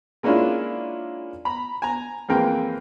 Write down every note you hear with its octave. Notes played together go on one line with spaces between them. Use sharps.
G#3 A#3 C#4 D4 E4 F4
A#5 B5
G#5 A#5
F2 E3 G#3 A#3 C4 G5